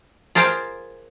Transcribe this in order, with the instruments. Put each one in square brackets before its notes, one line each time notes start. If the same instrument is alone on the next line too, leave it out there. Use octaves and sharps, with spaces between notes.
[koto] F4 G#4 A#4 C5 F5 G5